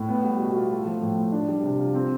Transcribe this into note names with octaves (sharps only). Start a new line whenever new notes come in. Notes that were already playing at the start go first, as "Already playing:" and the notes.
Already playing: A2
B3
G3
B2
F4
A3
F3
A2
A2
D4
G3
C3
F4
C4